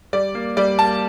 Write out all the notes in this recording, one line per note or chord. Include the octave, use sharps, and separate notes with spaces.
G3 D5
A#3
G3 D5
A#3 A5